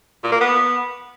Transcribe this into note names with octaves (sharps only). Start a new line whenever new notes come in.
A#2
A#3
B3